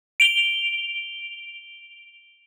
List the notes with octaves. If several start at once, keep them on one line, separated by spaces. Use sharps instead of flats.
D7 F7 G7